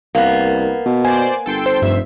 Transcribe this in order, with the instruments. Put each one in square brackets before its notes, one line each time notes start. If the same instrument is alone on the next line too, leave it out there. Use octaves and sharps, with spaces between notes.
[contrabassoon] C2 [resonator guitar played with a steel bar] A#3 B3
[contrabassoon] B2
[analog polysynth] C5 D5 [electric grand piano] G#5
[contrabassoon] G1 [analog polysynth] A4 G5 C6
[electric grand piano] C5
[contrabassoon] F1 [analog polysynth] G2 E5